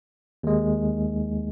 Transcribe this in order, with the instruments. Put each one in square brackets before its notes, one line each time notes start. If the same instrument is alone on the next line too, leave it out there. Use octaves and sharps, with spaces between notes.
[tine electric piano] D#2 G#3